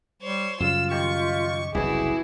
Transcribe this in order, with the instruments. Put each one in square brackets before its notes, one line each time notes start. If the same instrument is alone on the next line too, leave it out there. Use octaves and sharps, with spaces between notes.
[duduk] G3 [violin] C5 C#5
[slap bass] F#2 C#3 G3 [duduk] F4 [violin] E6
[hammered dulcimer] D#3 G4 [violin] C#6
[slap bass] F#1 C2 [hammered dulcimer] E3 [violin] E4 F#4 [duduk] G#4